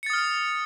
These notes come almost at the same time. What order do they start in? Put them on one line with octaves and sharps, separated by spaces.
C#7 A6 D#6 F6